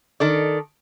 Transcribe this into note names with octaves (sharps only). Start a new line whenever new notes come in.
D#3 A4 D5